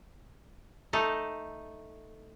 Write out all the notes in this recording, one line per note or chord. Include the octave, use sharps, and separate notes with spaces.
A3 D#4 A4